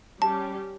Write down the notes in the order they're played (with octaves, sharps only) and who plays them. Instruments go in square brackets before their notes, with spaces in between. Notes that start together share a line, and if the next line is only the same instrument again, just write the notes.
[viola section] G3 C#4 G4 [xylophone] A5